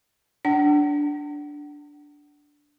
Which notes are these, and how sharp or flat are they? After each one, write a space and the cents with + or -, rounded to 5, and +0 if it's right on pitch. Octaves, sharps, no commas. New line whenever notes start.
D4 -5 F#5 +35